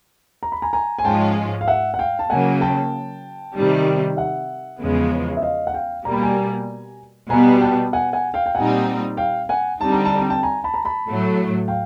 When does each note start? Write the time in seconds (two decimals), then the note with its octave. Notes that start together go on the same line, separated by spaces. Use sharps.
0.43 A#5
0.52 B5
0.62 G#5 A#5
0.73 G#5 A#5
0.99 G#5
1.04 G#2 F3 G#3 C#4 F4 G5 A5
1.61 F5
1.67 E5 F#5
1.94 F#5
1.99 F5 G5
2.19 A5
2.30 C#3 F#3 A#3 F#5 G#5
2.61 G5 A5
3.55 C3 D#3 G3
4.17 E5 F#5
4.80 E2 C#3 F3 G#3 B3
5.37 E5
5.42 D#5 F5
5.67 F#5
5.74 F5 G5
6.05 B2 G3 A#3 A#5
6.13 B5
6.22 G#5 A#5
7.30 B2 G3 B3 G#5 A#5
7.61 G5 A5
7.93 F#5 G#5
8.13 F#5 G#5
8.34 F5 G5
8.46 G5
8.55 A#2 G3 C4 D#4 F#5 G#5
9.17 F5 G5
9.49 F#5 G#5
9.80 D3 G3 C4 D#4 A5
9.92 A#5
10.05 A5
10.17 A#5
10.30 G5 A5
10.43 G#5 A#5
10.64 A5 B5
10.74 A#5
10.85 A5 B5
11.06 A2 F#3 A3
11.68 F5 G5